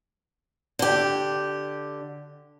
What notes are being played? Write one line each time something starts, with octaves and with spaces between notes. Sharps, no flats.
D3 G4